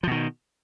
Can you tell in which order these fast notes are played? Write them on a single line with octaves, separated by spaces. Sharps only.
F3 B2 D#3